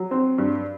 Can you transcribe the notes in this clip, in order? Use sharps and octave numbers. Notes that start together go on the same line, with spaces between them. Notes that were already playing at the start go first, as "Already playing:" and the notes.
Already playing: F#3
C4
G2